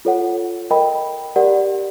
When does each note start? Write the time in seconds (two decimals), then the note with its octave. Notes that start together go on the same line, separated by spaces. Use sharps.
0.05 F4 A4 C#5 F#5
0.70 A#4 D#5 G5 B5
1.36 G4 A#4 D5 F#5